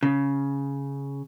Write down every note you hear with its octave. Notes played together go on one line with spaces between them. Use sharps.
C#3